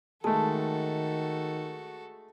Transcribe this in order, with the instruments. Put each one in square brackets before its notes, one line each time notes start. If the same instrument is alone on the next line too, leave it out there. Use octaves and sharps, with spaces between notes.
[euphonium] D#3 [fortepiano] G#3 A3 [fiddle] F#4 A4 [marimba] A5